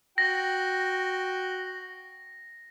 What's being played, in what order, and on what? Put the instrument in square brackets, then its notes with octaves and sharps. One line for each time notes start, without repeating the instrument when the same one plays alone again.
[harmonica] F#4 G5 [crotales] A#6